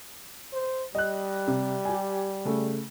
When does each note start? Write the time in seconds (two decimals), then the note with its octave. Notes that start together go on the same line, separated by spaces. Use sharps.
0.53 C5
0.95 G3 D#5 F#6
1.48 C3
1.85 G4 G#5
2.45 C#3 A3